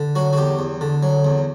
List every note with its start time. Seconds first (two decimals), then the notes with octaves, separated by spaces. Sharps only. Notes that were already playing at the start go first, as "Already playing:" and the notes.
Already playing: D3
0.15 F#3 F#4
0.33 F#4
0.37 E2 G4
0.59 E2
0.81 D3
1.03 F#3
1.25 E2